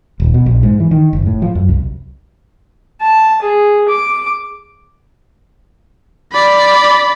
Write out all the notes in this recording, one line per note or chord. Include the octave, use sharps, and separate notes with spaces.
D#1
B2
A#1
G#2
E3
D#3
F#1
A2
F3
F#2
C2
A5
G#4
D6
D5 B5